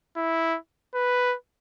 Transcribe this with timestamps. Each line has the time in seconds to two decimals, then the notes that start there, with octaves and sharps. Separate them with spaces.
0.17 E4
0.94 B4